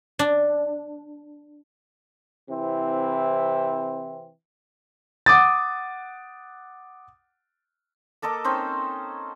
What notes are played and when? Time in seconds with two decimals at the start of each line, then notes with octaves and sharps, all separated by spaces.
0.19 D4
2.49 C3 E3 C4 E4
5.26 F#5 D6 D#6 A6
8.22 A#3 A4 D#5 D6
8.44 C4 C#4 D#4 C5